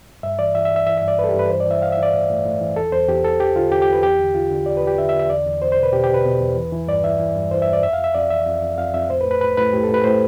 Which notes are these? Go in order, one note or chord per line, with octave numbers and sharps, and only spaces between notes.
G2 E5
E3 D5
E3 E5
E5
E3
E5
E3 E5
G2 E5
D5
G2 B4
A4
G4
G2
B4
E3 C5
D5
E3 E5
E3 F5
E5
E3
D5
A2
A2
A2
E3
E2 A4
E2 C5
E2 G4
E2 A4
E2 G4
D3 F4
E2 G4
G4
E2
B4
E2 G4
D3
D3 F4
D3
E2 D5
B4
E2
G4
D3 E5
E5
D3
E5
E2 D5
E2
E2 C5
C5
B2
B4
B2 G4
G4
B2
B4
B2
E2
E3
E3
G2 D5
E3 E5
E3
G2
E3 C5
E5
G2
D5
F2 E5
F5
F2
E5
F2 D5
E3 E5
F2
F2
F2 F5
F2 E5
A2 C5
B4
A2
B4
A2 B4
A2 B4
A2 G4
A4
A2
B4
A2 C5